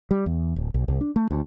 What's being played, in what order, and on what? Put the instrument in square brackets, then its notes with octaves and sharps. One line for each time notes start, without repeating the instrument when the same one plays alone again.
[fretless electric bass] G3
E2
D1
B1
C2
D4
A3
D2